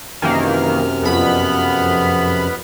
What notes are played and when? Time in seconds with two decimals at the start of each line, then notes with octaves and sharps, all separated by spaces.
0.22 F#2 C3 D#3 E3 A#3 F6
1.02 F2 B3 B5